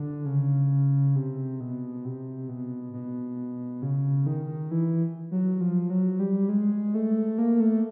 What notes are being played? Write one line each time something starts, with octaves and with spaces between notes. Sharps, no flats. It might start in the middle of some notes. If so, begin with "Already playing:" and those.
Already playing: D3
C#3
C3
B2
C3
B2
B2
C#3
D#3
E3
F#3
F3
F#3
G3
G#3
A3
A#3
A3